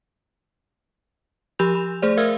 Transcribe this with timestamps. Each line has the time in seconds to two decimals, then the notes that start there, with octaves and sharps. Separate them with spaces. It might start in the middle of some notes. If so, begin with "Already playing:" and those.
1.59 F3 G4 B5 E6 G6 F7
1.75 B5
2.02 A3 G#4 C5 D5
2.17 A#4 E5 F5 E6 F6 G#6